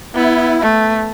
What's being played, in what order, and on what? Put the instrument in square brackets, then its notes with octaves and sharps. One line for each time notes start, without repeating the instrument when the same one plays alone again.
[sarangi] B3 [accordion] E4
[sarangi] A3